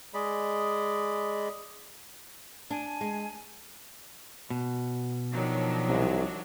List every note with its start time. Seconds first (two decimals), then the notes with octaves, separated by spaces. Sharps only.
0.14 G#3 G#4 D5 D#5 B5
2.70 D4 G#5
3.01 G#3
4.50 B2
5.33 D#3 F3 F#3 D4
5.89 C2